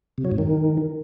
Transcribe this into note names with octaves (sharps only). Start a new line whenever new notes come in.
C3
F#3
G#2
D#3